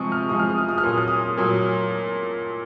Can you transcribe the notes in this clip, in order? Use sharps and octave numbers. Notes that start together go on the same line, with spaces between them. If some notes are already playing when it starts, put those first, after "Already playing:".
Already playing: C3 F3 G#3 C#6 D#6
F6
C3 F3 G#3 D#6
F6
D#6
F6
D#6
F6
A#2 F#3 D#6
F6
D#6
A#2 F#3